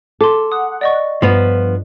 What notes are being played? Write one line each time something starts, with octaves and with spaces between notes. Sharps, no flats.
A4 C6 D6
F#5 D#6
D5 D#5 C#6
G2 F3 B3